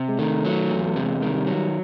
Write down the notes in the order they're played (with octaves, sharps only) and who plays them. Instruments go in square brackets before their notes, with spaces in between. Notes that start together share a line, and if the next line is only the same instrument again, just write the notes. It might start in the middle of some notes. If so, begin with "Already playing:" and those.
Already playing: [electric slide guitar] C3
[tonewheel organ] G#3
[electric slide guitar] D#3 [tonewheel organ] A3
[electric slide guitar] F#3
E2
[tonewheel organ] A3
[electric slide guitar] C3 [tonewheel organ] G#3
[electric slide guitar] D#3
[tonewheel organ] G3
[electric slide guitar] F#3